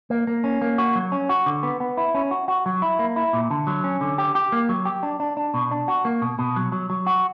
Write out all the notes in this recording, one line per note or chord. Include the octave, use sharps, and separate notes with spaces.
A#3
A#3
C#4
A#3
F#4
F#3
C#4
F#4
D3
B3
B3
E4
C#4
F#4
F#4
F#3
E4
A#3
E4
A#2
D3
F#3
C#4
D3
G4
G4
A#3
F#3
G4
D4
D4
D4
B2
D4
F#4
A#3
B2
B2
F#3
F#3
F#3
F#4